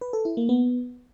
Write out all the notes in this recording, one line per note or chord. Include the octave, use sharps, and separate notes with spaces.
B4
A4
E4
A#3
B3